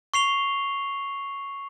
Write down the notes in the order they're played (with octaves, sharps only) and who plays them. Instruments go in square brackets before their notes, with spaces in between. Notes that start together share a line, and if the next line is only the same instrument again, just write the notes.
[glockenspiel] C#6 C7 F7 G7